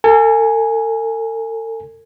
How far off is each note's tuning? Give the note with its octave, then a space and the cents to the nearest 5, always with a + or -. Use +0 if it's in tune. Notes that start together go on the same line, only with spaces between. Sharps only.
A4 +45 G#5 +0